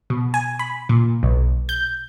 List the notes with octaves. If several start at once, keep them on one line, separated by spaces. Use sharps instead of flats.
B2
G#5
B5
A#2
B1
G6